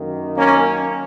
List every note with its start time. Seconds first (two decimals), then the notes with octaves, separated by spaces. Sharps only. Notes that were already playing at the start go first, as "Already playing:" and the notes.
Already playing: F#2 D#3 A#3
0.37 A#3 C#4